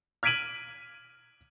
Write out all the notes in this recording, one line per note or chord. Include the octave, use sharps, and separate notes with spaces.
F6 G#6 B6 D7 D#7 F#7